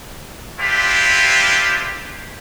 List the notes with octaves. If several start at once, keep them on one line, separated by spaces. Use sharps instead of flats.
C4 D4 E4 F4 G4